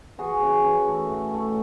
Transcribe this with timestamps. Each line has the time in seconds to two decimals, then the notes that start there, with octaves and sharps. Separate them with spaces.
0.18 E3 F#4 G#4
0.42 C#4
0.65 E3
0.88 A3
1.10 A2
1.34 A3